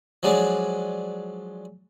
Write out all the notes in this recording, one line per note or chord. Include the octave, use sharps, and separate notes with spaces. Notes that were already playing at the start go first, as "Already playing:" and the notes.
F3 F#3 G#3 D4